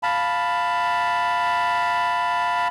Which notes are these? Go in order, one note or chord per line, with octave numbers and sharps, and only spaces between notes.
F5 A5 B5